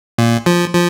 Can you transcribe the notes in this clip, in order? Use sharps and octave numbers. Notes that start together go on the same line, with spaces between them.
A#2
F3
F3